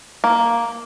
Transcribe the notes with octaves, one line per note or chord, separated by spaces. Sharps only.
A#3